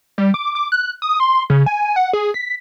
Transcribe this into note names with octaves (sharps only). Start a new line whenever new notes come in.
G3
D6
D6
F#6
D#6
C6
C#3
G#5
F#5
G#4
B6